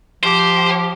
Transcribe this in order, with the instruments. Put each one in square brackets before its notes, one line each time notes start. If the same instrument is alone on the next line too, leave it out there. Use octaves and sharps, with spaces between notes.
[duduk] F3 [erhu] G4 [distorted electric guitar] C5